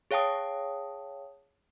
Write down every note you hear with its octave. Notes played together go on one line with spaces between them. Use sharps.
G#4 C#5 F5 G5 A5 D#6